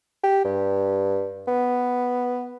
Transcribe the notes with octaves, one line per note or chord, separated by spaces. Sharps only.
G4
G2
B3